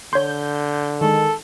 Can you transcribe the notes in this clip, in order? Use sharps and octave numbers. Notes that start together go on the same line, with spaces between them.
D3 C#5 C6 G6
D#3 G#3 A4